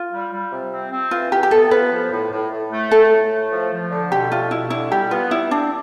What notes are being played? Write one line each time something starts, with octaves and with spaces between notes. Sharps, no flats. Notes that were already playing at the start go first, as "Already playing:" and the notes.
Already playing: F4
G3
G3
C3
C4
C4
E3 F4
E3 G4
G4
B3 A4
F4 B4
F3
A2
A2
A2
A3
A2 A4
A2
A3
F3
F3
D3
B2 G4
A3 F4
B2 E4
D3 E4
G3 G4
B3 F4
G3 E4
C4 D4